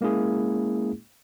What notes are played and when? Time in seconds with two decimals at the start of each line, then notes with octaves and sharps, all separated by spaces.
0.01 G#3 A#3 C#4 E4 G#4